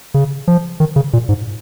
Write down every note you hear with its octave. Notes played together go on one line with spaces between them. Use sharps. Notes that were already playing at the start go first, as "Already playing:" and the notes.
C#3
F3
D#3
C#3
A#2
G#2